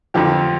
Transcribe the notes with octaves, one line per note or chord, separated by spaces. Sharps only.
F2 D3 F3 G4